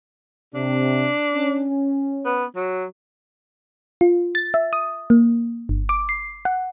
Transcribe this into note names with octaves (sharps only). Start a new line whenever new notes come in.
C3 D4
C#4
B3
F#3
F4
A6
E5
D#6
A#3
G1
D6
C7
F#5